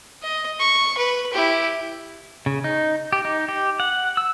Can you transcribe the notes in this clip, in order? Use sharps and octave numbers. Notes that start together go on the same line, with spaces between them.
D#5
C#6
B4
E4 G4
C#3
D#4
G4
D#4
G4
F#5
E6